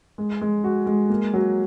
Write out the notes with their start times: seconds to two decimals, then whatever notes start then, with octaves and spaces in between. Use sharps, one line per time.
0.18 G#3
0.41 G#3
0.64 F#4
0.86 G#3
1.09 A#3
1.33 F#3